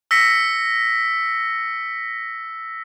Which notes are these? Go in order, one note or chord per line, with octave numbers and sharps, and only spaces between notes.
E6 A#6 B6 C#7